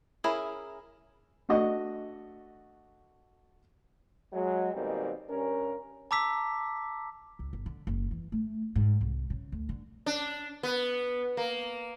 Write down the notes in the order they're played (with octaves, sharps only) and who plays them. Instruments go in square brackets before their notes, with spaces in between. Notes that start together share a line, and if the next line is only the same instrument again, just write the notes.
[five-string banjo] C#4 E4 G#4 A#4
[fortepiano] A3 D4 F#4 D#5
[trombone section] F#3 G#3
B2 D#3 G3 G#3 A#3 C4
G2 C#4 A#4
[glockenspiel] A5 A#5 D6 E6 B6
[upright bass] C#2
G1
D3
F#1
E3
A3
G#2
C2
C#3
D2
D3
[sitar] D4
B3
A#3